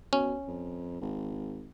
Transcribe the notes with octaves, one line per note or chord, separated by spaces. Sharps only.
B2 C#4
F2
G#1